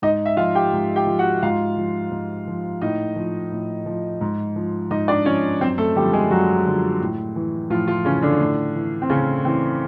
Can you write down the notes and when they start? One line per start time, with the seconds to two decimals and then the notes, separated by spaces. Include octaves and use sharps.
0.02 G#2 D#4 D#5
0.26 E5
0.37 F3 F4 F5
0.55 G4 G5
0.73 G#2
0.95 G4 G5
1.07 F3
1.19 F#4 F#5
1.42 G#2 F4 F5
1.77 F3
2.12 G#2
2.47 F3
2.81 A2 D#4 D#5
3.16 F3
3.52 A2
3.86 F3
4.21 G#2
4.56 F3
4.91 G#2 D#4 D#5
5.08 D4 D5
5.25 F3 C#4 C#5
5.60 F#2 C4 C5
5.78 A3 A4
5.96 D3 F3 G3 G4
6.13 G#3 G#4
6.30 F#2 F#3 F#4
6.66 D3 F3
7.01 A2
7.36 E3
7.70 A2 F3 F4
7.88 F3 F4
8.05 C#3 E3 C#4
8.22 D3 D4
8.40 A2
8.75 E3
9.02 C4
9.09 A2 C#3 C#4
9.45 E3 C4